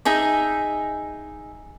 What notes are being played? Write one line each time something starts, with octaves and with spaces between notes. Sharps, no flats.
D#4 G#4 E5